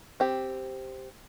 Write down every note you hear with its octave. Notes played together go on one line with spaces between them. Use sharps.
C4 G4